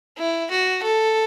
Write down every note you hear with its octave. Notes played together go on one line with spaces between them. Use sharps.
E4
F#4
A4